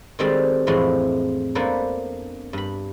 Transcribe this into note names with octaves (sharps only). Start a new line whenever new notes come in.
D#3 G3 G#3 C4 D4 A4
F2 A2 E3 G#3 C4
A#3 B3 D4 A4 B4 C5
G2 B5